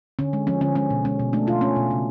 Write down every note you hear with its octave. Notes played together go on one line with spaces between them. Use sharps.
D3 C#4
G#3
F3 C#4
D3 C#4
G#3 C#4
B2
G#3 C#4
B2
A3 D4
B2 F4
A3 C#4
B2
C#3